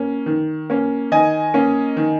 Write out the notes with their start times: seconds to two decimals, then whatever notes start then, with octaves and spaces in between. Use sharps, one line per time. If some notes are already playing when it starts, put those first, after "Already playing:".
Already playing: A#3 C#4
0.26 D#3
0.70 A#3 C#4
1.12 D#3 D#5 G#5
1.54 A#3 C#4
1.97 D#3